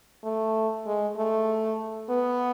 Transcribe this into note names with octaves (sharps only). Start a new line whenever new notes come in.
A3
G#3
A3
B3